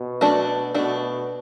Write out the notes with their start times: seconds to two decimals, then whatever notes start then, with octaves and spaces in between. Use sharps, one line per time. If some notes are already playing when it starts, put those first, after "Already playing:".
Already playing: B2
0.21 A3 D4 F#4
0.74 B2 A3 D4 F#4